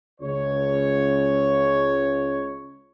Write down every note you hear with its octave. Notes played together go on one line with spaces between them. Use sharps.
C#2 C#5